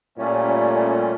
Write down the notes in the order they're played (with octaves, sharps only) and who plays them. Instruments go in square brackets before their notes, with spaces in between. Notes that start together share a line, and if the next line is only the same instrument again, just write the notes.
[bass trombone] A#2 [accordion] G3 A3 C#4